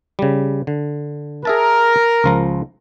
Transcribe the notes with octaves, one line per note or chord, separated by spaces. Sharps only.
C#3 G3
D3
G#4 A#4 E5 A5
C#2 F3 A#5